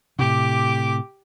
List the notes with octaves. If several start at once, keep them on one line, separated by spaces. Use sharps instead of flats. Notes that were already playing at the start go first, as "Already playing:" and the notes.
A2 C3 G4 D6